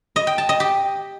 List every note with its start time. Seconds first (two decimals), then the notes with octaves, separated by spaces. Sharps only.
0.16 D#5
0.27 G5
0.38 A5
0.49 D#5
0.60 G4